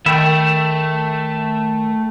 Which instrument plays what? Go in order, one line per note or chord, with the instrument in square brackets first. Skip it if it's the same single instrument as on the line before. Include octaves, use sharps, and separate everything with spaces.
[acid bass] D#3 [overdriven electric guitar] A3 [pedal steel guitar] E5 [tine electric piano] G5 B5